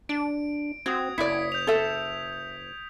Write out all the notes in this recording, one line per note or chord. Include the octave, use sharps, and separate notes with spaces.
D4 D7
C4 F#4 D#6 G#6
F#1 E4 D5 B6 C#7
G6 F7
A4 E5